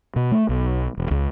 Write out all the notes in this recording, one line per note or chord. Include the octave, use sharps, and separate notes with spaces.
B2
A3
B1
E1
C#2